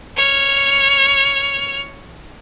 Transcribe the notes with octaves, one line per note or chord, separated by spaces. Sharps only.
C#5 F6